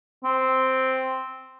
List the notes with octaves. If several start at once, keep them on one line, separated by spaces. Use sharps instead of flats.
C4